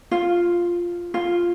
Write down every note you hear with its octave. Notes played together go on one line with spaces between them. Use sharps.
F4
F4